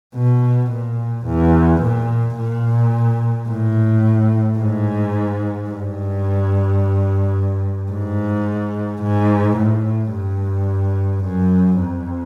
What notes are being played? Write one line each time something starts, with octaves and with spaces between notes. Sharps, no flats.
B2
A#2
E2
A#2
A#2
A2
G#2
G2
G#2
G#2
A2
G2
F#2
F2